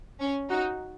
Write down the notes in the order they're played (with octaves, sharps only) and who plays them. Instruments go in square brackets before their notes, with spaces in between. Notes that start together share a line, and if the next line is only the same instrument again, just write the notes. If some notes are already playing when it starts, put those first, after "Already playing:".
[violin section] C#4
[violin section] D#4 [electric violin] F#4